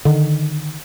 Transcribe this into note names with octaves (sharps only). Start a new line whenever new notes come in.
D3 D#3